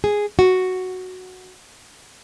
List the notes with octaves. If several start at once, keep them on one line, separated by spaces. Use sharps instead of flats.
G#4
F#4